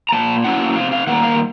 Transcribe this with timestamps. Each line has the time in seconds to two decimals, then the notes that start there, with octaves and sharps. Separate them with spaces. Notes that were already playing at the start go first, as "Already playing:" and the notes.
0.09 A#5
0.12 A#2 A5
0.44 F#3 A#3 C#4 E4 F#5
0.76 C3 F5
0.92 F5
1.07 D#3 G3 A#3 F#5
1.23 F5